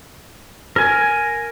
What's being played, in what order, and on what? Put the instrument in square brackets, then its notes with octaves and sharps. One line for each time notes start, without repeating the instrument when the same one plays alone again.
[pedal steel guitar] A#4 G#5